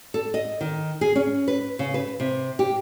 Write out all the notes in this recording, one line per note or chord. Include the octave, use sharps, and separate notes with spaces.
A4
D#5
D#3
G#4
C#4
B4
C#3
B4
C3
G4